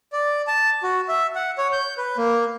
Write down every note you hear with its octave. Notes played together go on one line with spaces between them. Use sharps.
D5
A5
F#4
E5
F#5
C#5
G6
B4
A#3